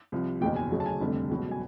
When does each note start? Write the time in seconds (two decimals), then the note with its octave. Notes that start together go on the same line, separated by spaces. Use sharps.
0.12 C2 C3 F3
0.41 F#1 E2 B2 G5
0.56 G#5
0.71 D2 C#3 F#3
0.80 A5
0.86 G#5
1.01 F1 F2 D3 G3
1.29 C#2 B2 F#3
1.51 G#5